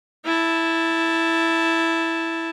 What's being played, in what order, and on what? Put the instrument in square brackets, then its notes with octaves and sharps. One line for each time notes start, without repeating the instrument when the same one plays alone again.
[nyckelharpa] E4 A5